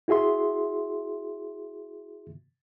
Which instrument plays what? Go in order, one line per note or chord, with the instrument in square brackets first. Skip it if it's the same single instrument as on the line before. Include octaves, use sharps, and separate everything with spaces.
[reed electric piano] E4 F#4 G#4 E5 C6